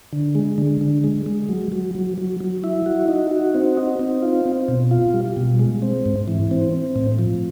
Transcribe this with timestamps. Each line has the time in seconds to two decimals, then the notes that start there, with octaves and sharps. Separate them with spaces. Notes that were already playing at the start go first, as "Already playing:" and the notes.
0.13 D3
0.35 G#3
0.58 D3
0.81 D3
1.04 G#3
1.26 G#3
1.49 F#3
1.72 F#3
1.95 F#3
2.18 F#3
2.40 F#3
2.64 E4
2.86 F#4
3.08 D#4
3.31 F#4
3.54 C4
3.77 D#4
3.99 C4
4.22 F4
4.45 C4
4.68 B2
4.91 F4
5.14 G3
5.37 B2
5.59 G#3
5.82 C4
6.06 G#2
6.28 E3
6.51 C4
6.73 C4
6.96 A2
7.19 F3